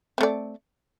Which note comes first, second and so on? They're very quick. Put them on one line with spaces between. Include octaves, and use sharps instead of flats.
C4 A3 D5